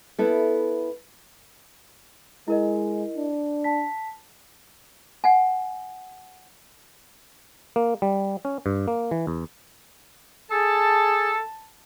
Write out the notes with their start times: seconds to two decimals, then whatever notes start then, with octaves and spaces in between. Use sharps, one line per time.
0.19 B3 E4 A4
2.48 G#3 E4 A#4 D#5
3.17 D4
3.64 A5 B6
5.24 F#5 G#5
7.76 A#3
8.02 G3
8.45 C#4
8.66 G2
8.88 A#3
9.11 E3
9.27 E2
10.50 G#4 A4 A5